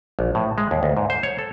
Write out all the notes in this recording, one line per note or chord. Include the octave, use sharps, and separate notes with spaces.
A#1
A2
G#3
D#2
D2
G#2
C5
C#5
A4